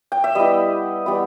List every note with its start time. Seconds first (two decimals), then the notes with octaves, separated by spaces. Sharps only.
0.12 G5
0.24 E5
0.35 G3 B3 E4 D#5
1.06 G3 B3 E4